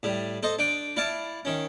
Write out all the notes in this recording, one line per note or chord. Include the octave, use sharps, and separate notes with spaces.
A2 G3
A4 C5 D#5
D4 G5 D6
E4 D5 F5 A5
D#3 C#4